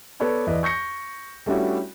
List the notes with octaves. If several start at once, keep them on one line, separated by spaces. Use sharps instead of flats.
B3 A4 B4 C#5 D5 B5
E2 E4 B4 D5 D#5
C#6 G6 A#6 C#7
G3 A3 C#4 D4 E4 F#4